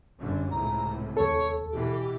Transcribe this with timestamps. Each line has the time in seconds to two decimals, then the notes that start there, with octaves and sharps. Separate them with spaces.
0.19 G1 F#2 D3
0.51 C#2 A2 C3 A#5
1.17 D#2 A4 C#5
1.71 B2 E3 G4